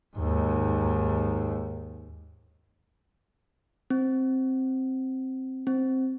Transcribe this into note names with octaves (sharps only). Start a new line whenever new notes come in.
D#2 G#2
C4
C4